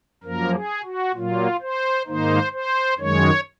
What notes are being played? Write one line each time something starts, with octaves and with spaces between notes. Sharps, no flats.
F#2 F3 A#3 A#4
G#4
F#4
A#2 F#3 A#3 F4
C5
G#2 D#3 A#3 D#4 C5
C5
F#2 D#3 G#3 C#5